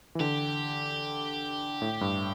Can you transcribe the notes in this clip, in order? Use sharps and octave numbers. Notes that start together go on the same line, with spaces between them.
E3
D3 G4
A2
G2